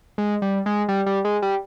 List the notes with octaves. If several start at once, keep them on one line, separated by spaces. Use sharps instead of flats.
G#3
G3
G#3
G3
G3
G#3
G3